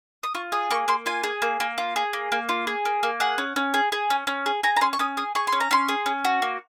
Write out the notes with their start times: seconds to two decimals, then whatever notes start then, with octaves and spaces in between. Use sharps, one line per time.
0.23 D#6
0.35 F4 C#6
0.52 G#4 D#6
0.70 A#3 C#6
0.88 A#3 C6
1.06 F4 G#5
1.23 G#4
1.42 A#3
1.60 A#3
1.78 F4
1.96 G#4
2.13 A#3
2.32 A#3
2.49 F4
2.67 G#4
2.85 A#3
3.03 A#3
3.20 G#4 F#5
3.38 C#4
3.56 C#4
3.74 G#4
3.92 G#4
4.10 C#4
4.27 C#4
4.46 G#4
4.63 G#4 A#5
4.76 A#5
4.81 C#4 C6
4.93 C#6
4.99 C#4 D#6
5.17 G#4 D#6
5.35 G#4 C#6
5.47 C6
5.52 C#4
5.60 A#5
5.71 C#4 C6
5.88 G#4
6.06 C#4
6.25 F#4
6.42 A#3